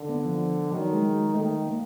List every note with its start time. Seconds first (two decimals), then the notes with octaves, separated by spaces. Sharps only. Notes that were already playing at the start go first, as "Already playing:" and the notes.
Already playing: D3
0.09 B3
0.25 F3
0.71 D#3 F#3
0.92 G#3
1.34 D#3 A3
1.66 A#3